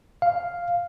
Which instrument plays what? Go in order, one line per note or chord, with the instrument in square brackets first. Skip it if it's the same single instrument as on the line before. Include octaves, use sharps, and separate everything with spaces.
[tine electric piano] F5